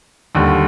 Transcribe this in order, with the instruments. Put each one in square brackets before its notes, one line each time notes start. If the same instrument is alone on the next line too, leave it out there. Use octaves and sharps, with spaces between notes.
[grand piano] D#2 D3 G3